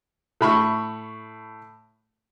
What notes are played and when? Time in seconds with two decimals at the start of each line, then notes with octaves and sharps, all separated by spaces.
0.41 A2 B5 C#6